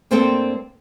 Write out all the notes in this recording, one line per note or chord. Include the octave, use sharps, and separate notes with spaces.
G2 A#3 C4 A4 C5 G5